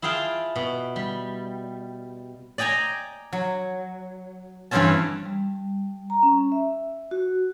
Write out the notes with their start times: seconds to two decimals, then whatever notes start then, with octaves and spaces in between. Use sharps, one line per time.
0.02 E4 F4 G#4 F5 G5 A5
0.56 B2
0.96 G3
2.58 D5 D#5 G5 G#5 A#5
3.33 F#3
4.71 G2 E3 G3 C4 C#4 A5
5.26 G3
6.10 A#5
6.23 C#4
6.52 E5
7.11 F#4